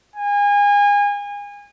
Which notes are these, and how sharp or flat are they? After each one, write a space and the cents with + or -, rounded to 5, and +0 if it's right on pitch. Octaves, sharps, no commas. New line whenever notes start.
G#5 -30